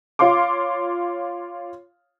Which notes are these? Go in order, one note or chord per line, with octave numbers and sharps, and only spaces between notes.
F4 C#5 F5 C6 D6